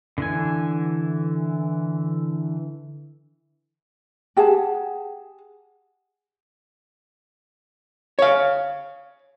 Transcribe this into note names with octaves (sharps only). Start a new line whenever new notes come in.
D3 E3 G#5
G4 G#4 F#5 A5
C#5 F5